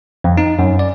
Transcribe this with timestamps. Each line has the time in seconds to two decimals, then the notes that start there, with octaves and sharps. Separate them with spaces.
0.24 F2
0.37 D#4
0.59 F#2
0.79 D5